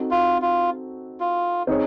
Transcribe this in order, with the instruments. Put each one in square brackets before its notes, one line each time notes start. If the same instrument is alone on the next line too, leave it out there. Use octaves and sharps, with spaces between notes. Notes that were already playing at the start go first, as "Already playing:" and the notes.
Already playing: [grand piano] C4 D#4 F#4 A4
[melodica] F4
F4
F4
[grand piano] C4 D#4 G#4 C#5